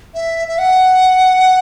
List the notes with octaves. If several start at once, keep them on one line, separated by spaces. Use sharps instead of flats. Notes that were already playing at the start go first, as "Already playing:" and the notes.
E5
E5
F#5